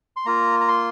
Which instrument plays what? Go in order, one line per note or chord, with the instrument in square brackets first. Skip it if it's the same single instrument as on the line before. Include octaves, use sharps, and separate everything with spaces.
[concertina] C6
A#3 F4 A#5
A#5
C6